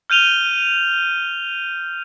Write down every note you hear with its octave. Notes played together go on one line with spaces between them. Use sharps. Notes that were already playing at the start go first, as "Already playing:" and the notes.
F6 G6 D#7 F7 G7